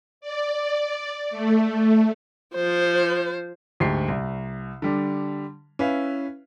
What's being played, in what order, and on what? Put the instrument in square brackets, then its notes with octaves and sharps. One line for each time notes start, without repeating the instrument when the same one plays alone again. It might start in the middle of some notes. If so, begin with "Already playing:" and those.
[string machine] D5
A3
[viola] F3 C5
[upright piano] D2 G#2 G4 C7
C2
D3 G3 D4
C#4 E4 B4 E5 F5